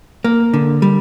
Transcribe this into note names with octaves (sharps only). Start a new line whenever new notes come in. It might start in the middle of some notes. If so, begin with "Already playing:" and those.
A#3
D3
G3